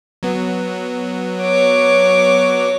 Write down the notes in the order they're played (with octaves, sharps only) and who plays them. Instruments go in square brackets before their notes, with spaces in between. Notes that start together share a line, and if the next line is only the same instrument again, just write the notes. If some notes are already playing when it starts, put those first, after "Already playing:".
[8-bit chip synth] F#3 B3
[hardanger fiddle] C#5 D6